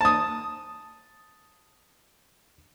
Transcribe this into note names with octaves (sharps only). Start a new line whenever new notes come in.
A5 D#6